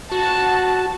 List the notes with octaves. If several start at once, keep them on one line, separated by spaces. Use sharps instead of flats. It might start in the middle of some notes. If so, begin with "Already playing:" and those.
F#4 A5